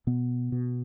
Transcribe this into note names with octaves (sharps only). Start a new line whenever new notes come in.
B2 B3
B2